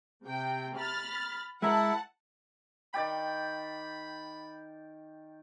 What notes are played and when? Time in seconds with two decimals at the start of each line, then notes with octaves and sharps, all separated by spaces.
0.24 C3 G5
0.77 B5 F6 A6
1.62 G#3 E4 A#4 E5 F#5 A5
2.94 D#3 D5 G5 B5